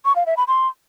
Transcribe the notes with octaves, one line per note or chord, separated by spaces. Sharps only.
C#6
F5
E5
B5
C6